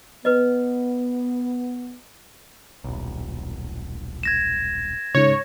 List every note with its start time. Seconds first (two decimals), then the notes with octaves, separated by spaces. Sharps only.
0.25 B3 B4 D#5
2.84 D#1 B1
4.23 G#6 A#6 E7
5.15 C#2 G#2 C#5